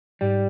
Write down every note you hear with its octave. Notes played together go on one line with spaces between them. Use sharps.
G#2 G3